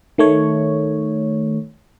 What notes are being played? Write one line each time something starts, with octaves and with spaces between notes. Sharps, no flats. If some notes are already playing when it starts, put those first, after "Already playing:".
D#3 A3 C#5